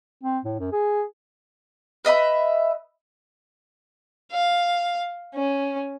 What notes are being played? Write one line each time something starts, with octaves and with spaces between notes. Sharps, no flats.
C4
A2
F#2
G#4
B4 D#5 E5 B5
F5
C#4